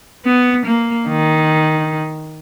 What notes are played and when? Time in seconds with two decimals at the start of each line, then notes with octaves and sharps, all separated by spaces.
0.25 B3
0.66 A#3
1.08 D#3